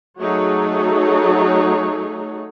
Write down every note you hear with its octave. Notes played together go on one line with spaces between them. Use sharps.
F#3 A3 D#4 F#4 G#4 C#5